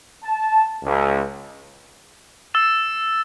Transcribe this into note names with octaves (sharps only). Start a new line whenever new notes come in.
A5
C#2
E6 A6 E7